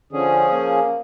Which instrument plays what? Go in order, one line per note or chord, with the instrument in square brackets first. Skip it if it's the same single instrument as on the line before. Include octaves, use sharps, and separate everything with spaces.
[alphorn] D3 [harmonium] F3 C#4 G#4
[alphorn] A#3